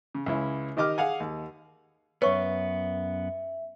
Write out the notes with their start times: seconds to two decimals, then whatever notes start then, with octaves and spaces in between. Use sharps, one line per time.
0.15 C#3
0.26 C#2 C#4 E4
0.77 D#3 G4 D#5 D6 F6
0.98 G#4 F5 F#5 G#5
1.20 D#2
2.22 F#2 B3 B4 C#5 E5 C#6